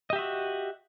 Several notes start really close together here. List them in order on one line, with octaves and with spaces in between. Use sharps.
D#5 G4 E5 F#4